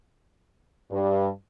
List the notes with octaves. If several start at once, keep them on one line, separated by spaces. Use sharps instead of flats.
G2